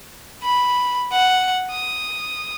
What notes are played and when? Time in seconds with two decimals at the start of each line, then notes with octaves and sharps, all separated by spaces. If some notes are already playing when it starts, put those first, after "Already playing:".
0.43 B5
1.12 F#5
1.71 D#6